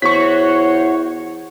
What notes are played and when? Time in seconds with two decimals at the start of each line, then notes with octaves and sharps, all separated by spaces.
0.02 E2 F#4 C5 C#5 C#6 B6